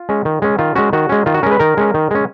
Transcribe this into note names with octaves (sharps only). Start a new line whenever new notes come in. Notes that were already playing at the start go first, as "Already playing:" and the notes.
Already playing: F4
G#3 C#4
D#3
G#3 C#4
D#3 F4
G#3 C#4 F#4
D#3 F#4
G#3 C#4
D#3 F4
F#4
G#3 C#4 A#4
B4
D#3 A#4
G#3 C#4
D#3
G#3 C#4